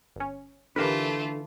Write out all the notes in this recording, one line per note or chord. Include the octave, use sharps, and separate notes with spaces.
G1 C#4
D3 E3 A3 F4 G4 A#4 B4